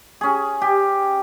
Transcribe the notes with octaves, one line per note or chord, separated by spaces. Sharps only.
C#4 G#4
G4